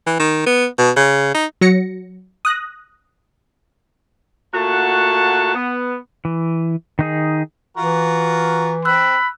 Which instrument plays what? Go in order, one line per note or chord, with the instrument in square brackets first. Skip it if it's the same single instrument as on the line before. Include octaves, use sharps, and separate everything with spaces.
[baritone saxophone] E3
D#3
B3
B2
C#3
D#4
[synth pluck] F#3 A#6 C#7
D#6 F#6 A#6
[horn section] A#2 A3 F#4 F#5 A5
B3
[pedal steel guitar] E3
D#3 D#4 G#4
[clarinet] E3 [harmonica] F4 F#4 A#4
[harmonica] C4 [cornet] B5 [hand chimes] E6 F#6